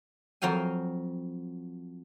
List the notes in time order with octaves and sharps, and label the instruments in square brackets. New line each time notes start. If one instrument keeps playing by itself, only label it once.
[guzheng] F2 F#3 F5 G5 G#5